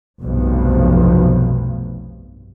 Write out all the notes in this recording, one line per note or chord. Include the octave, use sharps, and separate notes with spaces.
F1 B1 G2 B2 F3